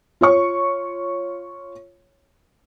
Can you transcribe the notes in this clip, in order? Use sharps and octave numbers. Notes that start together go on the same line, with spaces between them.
F4 C#5 C#6